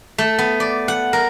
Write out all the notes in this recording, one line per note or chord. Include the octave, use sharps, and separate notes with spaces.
A3
B3
D5
F#5
A#4